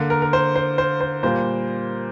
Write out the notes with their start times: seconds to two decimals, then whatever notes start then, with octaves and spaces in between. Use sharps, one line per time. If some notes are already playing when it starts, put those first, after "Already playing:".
Already playing: D3 A#3
0.10 A#4
0.22 A#4
0.33 C5
0.56 C5
0.78 C5
1.01 C5
1.23 A#2 G3 A#3 C5